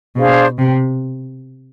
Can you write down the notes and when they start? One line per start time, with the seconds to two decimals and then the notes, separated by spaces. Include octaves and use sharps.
0.16 B2 D4 G#4 C5 F5
0.58 C3